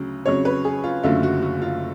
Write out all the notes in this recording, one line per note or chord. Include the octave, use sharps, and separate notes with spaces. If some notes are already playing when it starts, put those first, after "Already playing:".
Already playing: D2 C#3 F#3
F2 C#3 F#3 C#5
B4
G#4
F4
F#1 F#2 D3 F#3 A3 F4
F#4
F#4
F4